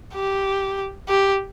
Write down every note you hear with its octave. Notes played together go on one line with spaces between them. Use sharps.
G4
G4